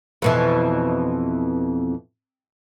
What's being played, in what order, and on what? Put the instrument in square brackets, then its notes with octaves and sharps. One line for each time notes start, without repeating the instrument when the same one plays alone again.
[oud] F2 B2 E3